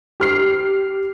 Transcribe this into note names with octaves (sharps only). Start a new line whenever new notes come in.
G4 F6 C7